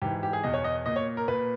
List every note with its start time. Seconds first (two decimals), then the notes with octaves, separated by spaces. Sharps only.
0.02 G#2 E3 G4
0.23 G4
0.33 G#4
0.44 E2 B2 D#5
0.54 C#5
0.64 D#5
0.86 A#2 D#5
0.96 C#5
1.17 A#4
1.28 A#2 B4